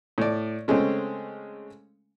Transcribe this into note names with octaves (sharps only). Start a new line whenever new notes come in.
A2 D5
C#3 G#3 A3 C4 C#4